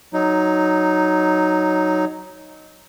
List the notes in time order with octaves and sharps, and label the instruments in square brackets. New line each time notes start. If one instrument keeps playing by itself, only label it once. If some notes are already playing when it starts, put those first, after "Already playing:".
[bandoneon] F#3 D#4